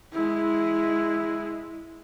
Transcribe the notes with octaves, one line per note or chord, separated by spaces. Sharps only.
G#3 E4